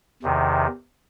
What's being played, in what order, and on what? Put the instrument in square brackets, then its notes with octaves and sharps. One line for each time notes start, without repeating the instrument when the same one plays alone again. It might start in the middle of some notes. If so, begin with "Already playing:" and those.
[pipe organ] E2 C3 D#3